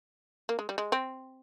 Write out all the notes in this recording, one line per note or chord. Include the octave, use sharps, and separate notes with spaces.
A#3
G#3
G3
G#3
C4